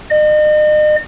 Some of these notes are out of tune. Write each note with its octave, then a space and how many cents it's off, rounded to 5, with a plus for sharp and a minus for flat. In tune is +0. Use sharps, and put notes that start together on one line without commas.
D#5 -40